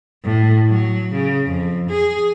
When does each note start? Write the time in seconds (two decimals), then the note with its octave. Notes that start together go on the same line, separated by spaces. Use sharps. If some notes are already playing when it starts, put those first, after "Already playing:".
0.24 A2
0.69 F#3
1.13 C#3
1.47 F2
1.90 G#4